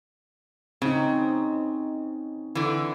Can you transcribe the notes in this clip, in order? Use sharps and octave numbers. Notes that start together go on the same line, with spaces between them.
C#3 C4 D#4
D3 E3